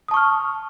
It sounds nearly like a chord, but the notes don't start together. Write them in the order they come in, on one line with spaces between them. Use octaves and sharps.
D#6 A5 C#6 F6